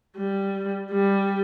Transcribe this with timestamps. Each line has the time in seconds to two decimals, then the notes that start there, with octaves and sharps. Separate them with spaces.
0.17 G3
0.91 G3